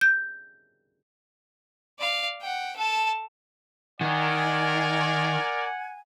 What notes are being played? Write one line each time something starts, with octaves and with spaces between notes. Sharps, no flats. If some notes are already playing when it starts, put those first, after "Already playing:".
G6
D5 F5
F#5 G5
A4 A5
D#3 A#4 D5 F#5 G#5